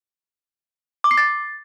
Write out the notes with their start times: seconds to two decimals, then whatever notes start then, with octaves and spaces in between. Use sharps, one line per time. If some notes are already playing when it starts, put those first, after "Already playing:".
1.04 D6
1.11 C7
1.18 A6